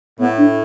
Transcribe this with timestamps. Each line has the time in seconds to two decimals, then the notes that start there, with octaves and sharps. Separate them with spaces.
0.19 A2 B3
0.37 D4